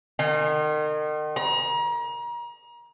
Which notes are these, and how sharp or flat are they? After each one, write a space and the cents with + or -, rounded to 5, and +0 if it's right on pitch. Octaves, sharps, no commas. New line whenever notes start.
D#3 -35
A#5 +35